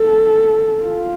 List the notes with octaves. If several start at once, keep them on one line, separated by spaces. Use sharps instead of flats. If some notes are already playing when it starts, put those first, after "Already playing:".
Already playing: A4
F4